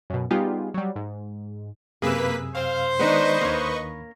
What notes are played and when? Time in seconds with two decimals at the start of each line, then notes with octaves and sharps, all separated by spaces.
0.10 F#2 B2
0.31 G3 B3 D#4 F4 G4 G#4
0.74 F#3 G3
0.96 G#2
2.02 F#2 C3 A#3 G#4 B4 E6 B6
2.55 C5 F5
3.00 D#3 G#3 B3 D4 D#4 B4 D#5 C#6
3.41 D#2 D#3 A#3 C#5 B5